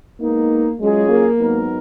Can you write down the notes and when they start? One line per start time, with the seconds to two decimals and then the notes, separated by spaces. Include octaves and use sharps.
0.20 G#3 A#3 B3 D#4
0.80 F#3 G#3 C#4 F4 G#4
1.09 A#3
1.39 G#2 F#3 B3 D#4 A#4